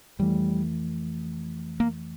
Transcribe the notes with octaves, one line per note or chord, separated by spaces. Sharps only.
F2 E3 G3 A3
A#3